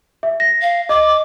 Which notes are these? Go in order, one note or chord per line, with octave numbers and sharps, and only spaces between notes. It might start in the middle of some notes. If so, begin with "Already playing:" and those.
E5
A#6
F5
D#5 D6